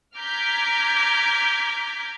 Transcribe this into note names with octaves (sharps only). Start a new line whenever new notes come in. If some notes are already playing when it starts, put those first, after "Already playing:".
A#5 D6 F6 G6 G#6 B6